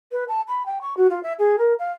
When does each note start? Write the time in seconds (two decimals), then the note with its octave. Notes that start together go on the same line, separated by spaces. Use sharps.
0.12 B4
0.28 A5
0.48 B5
0.66 G5
0.81 C#6
0.97 F#4
1.10 F4
1.23 E5
1.39 G#4
1.58 A#4
1.79 F5